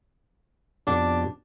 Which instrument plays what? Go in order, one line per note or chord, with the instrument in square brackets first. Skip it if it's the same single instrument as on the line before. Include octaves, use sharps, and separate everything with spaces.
[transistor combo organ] F2 B2 G4 [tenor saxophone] D4